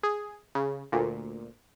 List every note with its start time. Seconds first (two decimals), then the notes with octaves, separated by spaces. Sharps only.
0.03 G#4
0.55 C#3
0.92 D2 A#2